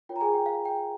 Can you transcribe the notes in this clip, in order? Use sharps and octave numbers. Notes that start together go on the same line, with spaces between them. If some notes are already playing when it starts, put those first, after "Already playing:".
F4 A#4 C#5 G5
A#5
G#4 G#5
G5
F5
G5